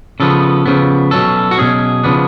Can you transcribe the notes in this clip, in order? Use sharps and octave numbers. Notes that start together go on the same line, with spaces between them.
C#3 F3 B3 A4
C#3 F3 B3
B2 F#3 C#4 A4
F#4
B2 F#3 C#4 G#4
C#3 F3 B3 D4